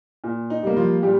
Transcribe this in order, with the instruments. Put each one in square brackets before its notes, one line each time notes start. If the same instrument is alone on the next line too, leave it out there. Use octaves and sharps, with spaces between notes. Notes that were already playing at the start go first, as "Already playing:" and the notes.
[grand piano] A#2
D#4
G3 A#3
F3 F4
A#2 G3 G4